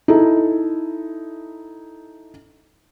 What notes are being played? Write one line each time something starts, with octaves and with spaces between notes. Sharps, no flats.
D#4 E4 A4